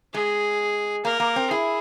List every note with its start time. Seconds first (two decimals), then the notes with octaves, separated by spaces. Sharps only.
0.14 G#3 G#4
1.05 A#3 A#4
1.20 A#3
1.36 C4
1.50 E4 G#4